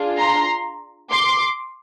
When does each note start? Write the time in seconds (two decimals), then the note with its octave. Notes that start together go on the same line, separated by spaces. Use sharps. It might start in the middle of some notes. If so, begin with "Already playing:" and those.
Already playing: D4 F4 G#4
0.18 A#5 C6
1.12 C6 D6